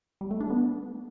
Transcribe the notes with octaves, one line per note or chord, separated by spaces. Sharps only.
G3
A3
D4
B3